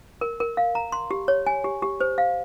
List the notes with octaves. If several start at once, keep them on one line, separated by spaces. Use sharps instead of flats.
A#4
A#4
F5
A#5
C6
G4
C#5
G#5
G4
G4
C5
F5